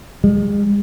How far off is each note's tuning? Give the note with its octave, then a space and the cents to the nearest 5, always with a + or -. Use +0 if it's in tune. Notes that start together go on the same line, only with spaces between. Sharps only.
G#3 -35